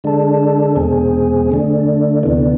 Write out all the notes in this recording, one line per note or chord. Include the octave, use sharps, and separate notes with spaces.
D3 G#3 D4 A4
E2 B2 G#3 C4 G#4
D3 A3 D4
D2 C3 E3 B3 D4